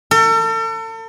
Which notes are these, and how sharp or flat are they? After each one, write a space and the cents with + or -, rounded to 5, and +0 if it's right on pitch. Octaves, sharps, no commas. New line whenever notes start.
A4 +40